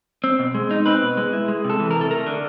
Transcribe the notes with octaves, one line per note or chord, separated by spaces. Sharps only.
C4
B2
G#3
D#4
C4 B4
B2
G#3
E4
G#3
C3
A4
E3
C3 A#4
A4
A3 A#4
D3